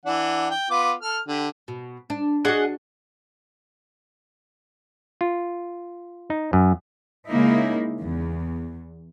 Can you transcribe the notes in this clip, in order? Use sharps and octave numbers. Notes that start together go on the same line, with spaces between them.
E3 D4 F#5
G5
B3 F4 D6
A4 F6
D3 G4
B2
D4
D4 F#4 G#4 D#5 F#5
F4
D#4
F#2
C#3 G#3 A#3 D#4 E4
E2